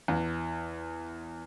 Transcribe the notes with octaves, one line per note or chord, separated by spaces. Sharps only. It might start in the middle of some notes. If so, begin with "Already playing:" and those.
E2